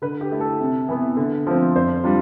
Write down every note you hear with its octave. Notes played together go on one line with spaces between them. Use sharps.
D3 B4
G4
A3 E4
A4
C3
E3 B3
D3
F3 A3 C4
F2 C5
G3 D4 F4